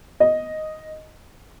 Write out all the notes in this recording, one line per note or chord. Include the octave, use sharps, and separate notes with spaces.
D#5